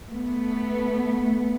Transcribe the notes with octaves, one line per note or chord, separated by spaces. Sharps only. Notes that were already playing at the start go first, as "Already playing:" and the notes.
A3 B3